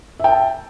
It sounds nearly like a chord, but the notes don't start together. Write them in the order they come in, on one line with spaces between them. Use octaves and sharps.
E5 G5 A5